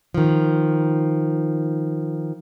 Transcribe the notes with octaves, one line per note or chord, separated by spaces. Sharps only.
D#3 F3